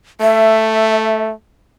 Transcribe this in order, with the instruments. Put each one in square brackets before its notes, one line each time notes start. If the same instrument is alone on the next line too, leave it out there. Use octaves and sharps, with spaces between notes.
[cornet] A3 [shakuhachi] E5